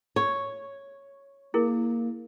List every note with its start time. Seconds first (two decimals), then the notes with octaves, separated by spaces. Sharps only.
0.16 C#5
1.54 A#3 E4 G#4 A#4